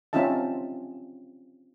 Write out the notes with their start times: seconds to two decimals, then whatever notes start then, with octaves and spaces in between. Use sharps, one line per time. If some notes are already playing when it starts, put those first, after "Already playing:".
0.13 C4 C#4 D#4 F4 E5 A5